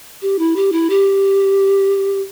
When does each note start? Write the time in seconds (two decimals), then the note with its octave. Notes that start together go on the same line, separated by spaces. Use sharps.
0.22 G4
0.39 E4
0.56 G4
0.72 E4
0.90 G4